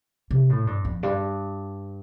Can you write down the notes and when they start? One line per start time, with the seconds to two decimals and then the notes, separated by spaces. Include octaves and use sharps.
0.31 C3
0.50 A2
0.67 G2
0.85 F2
1.03 G2